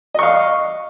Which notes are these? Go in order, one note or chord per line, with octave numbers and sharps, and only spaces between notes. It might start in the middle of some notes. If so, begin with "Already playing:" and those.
D#5 F5 C#6